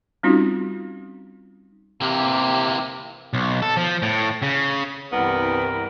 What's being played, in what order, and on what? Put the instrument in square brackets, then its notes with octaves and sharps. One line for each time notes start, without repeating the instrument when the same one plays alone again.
[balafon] G3 C4 C#4 D#4 F4 F#4
[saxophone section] C3 [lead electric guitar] E3 A#3 [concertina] G4
[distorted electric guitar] B1
A4
F3
A2
C#3
[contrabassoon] C2 [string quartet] G2 E3 G3 [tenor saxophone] B3 [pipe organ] A#4